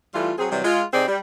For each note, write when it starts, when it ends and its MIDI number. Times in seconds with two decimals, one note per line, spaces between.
0.14 0.33 52
0.14 0.33 55
0.14 0.33 57
0.14 0.33 65
0.39 0.47 54
0.39 0.47 60
0.39 0.47 68
0.51 0.61 48
0.51 0.61 52
0.51 0.61 54
0.51 0.61 55
0.64 0.83 56
0.64 0.83 65
0.93 1.04 48
0.93 1.04 60
0.93 1.04 63
0.93 1.04 68
0.93 1.04 74
1.07 1.18 55